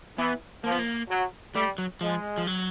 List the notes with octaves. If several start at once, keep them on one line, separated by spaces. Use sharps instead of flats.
E3 B3
F3 A#3
B3
A#3
F#3
G3 A3
F#3
F3 G#3
F3
F#3